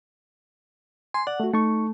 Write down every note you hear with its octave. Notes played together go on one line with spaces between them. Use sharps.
G#5 C6
D5 F#5
A3 F#4
A3 D#4 C#6